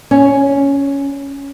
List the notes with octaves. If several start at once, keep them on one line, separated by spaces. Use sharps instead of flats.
C#4